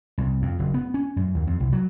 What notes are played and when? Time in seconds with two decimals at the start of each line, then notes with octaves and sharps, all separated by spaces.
0.18 C2
0.42 F2
0.59 F#1
0.74 B3
0.94 C#4
1.16 F#2
1.35 D#2
1.47 F2
1.60 C2
1.73 F#3